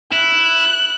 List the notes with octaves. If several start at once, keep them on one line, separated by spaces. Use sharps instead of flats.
E4 F#6